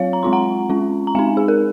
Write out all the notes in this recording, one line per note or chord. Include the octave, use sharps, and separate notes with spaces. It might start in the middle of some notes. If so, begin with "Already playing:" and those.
Already playing: F#3 C4 F4 C#5 F5
A#5
G#3 C4 F4 C6
F#5 A#5
G#3 C#4 F4
A#5
G#3 C4 D#4 F5 G#5
G#4
A#4